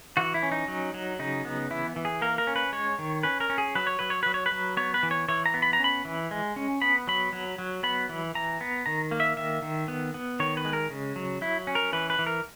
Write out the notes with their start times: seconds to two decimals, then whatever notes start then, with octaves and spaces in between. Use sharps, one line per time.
0.17 E3 F#4
0.34 E4
0.43 C#4
0.52 D#4
0.68 F#3
0.94 F#3
1.19 C#3 D#4
1.45 B3
1.71 E3 E4
1.96 E3
2.05 G#4
2.22 A#3 A#4
2.38 A#4
2.47 C#4
2.56 B4
2.72 G#3 C#5
2.99 D#3
3.23 C#4 B4
3.40 A#4
3.50 C#4
3.58 G#4
3.75 F#3 B4
3.87 C#5
3.99 F#3 B4
4.10 C#5
4.23 F#3 B4
4.34 C#5
4.46 B4
4.52 F#3
4.77 B3 C#5
4.94 B4
5.03 E3
5.11 C#5
5.29 E3 C#5
5.46 A#5
5.54 B3
5.62 B5
5.73 A#5
5.79 C#4
5.84 B5
6.05 E3
6.31 G#3
6.56 C#4
6.82 B3 B5
7.07 F#3 B5
7.33 F#3
7.58 F#3
7.83 B3 B5
8.09 E3
8.35 E3 A#5
8.61 B3
8.86 D#3 A#5
9.11 A#3
9.20 E5
9.37 D#3 E5
9.62 D#3
9.88 B3
10.14 B3
10.40 D#3 C#5
10.57 B4
10.65 G#3
10.73 A#4
10.90 C#3
11.16 F#3
11.41 F#3 E4
11.67 C#4
11.75 A#4
11.93 E3 B4
12.10 B4
12.19 E3
12.27 A#4